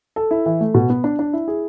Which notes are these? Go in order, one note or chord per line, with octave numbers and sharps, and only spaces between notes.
A4
E4
E3
A3
B2
B3
D4
D4
E4
G#4